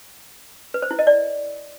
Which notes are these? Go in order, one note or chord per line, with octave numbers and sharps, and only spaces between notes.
B4
C5
E4
D#5
D5